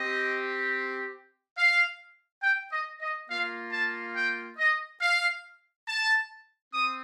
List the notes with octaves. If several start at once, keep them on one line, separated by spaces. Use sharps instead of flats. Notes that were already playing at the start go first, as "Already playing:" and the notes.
Already playing: C4 G4 D#5
F5
G5
D#5
D#5
A#3 F4 F5
A5
G5
D#5
F5
A5
C4 D#6